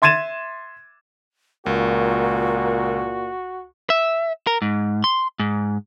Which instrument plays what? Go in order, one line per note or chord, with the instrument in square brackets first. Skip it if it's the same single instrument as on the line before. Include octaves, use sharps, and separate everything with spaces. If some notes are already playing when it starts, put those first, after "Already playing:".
[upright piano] E5 C6 G#6 A6 D#7 E7
[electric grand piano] C#2 [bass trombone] A#2 [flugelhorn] F#4 [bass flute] A#4
[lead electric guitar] E5
A#4
G#2
C6
G#2